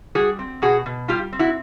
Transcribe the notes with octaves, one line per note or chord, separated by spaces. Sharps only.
G3 F#4 G#4
C4
B2 F#4 G#4
B2
G3 F4 G4
C4
E4 F#4